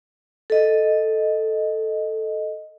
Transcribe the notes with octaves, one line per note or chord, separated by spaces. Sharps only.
A4 D#5